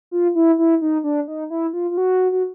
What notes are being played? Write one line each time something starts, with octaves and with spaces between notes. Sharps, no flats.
F4
E4
E4
D#4
D4
D#4
E4
F4
F4
F#4
F#4